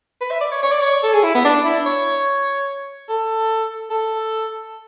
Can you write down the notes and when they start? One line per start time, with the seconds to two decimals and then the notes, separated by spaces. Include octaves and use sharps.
0.21 B4
0.31 E5
0.41 D5
0.52 C#5
0.63 C#5
0.72 D5
0.82 C#5
1.03 A4
1.14 G#4
1.23 E4
1.35 B3
1.44 D4
1.65 E4
1.86 C#5
3.09 A4
3.90 A4